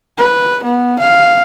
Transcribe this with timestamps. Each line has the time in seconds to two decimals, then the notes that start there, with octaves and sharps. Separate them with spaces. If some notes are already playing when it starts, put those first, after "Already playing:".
0.18 B4
0.63 B3
0.99 F5